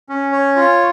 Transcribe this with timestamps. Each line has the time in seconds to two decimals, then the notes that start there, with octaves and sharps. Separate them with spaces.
0.09 C#4
0.32 C#5
0.56 F4